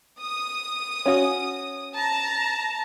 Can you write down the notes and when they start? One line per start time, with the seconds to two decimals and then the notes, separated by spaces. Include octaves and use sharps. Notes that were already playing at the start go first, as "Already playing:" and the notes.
0.20 D#6
1.06 C#4 F#4
1.96 A5 A#5